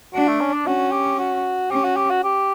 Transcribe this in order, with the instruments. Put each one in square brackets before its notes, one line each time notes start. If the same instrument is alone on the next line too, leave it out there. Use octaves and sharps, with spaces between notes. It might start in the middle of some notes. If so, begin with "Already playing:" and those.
[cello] D4 [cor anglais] F#4
[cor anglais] A3
C#4
D4
[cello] C#4 [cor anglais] F#4
[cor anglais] G4
F#4
[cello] C#4 [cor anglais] G4
[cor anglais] F#4
G4
F#4
G4